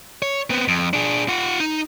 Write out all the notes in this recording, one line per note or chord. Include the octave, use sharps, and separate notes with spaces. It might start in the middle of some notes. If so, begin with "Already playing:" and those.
C#5
B3 C4
F2
D4 G#4
F4 F#5
D#4